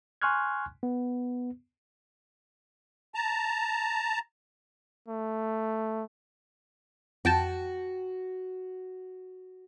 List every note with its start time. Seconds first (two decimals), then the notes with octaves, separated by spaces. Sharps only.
0.22 G#5 C6 C#6 F6 F#6 G#6
0.83 B3
3.15 A5 A#5
5.08 A3
7.25 F2 F#4 G5 A5